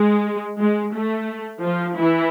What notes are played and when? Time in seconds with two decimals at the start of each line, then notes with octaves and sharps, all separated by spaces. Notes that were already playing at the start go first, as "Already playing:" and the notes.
Already playing: G#3
0.59 G#3
0.94 A3
1.63 F3 F4
1.98 E3 E4